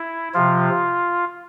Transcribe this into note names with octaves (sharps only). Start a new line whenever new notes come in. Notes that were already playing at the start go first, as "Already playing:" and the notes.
Already playing: E4
C3 F3 F4